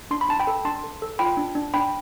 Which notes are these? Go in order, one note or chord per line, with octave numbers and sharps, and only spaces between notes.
D4 C6
B5
D4 A5
G5 B5
A4
D4 A5 C6
A4
A4
F4 G5 B5
D4
D4
D4 G5 B5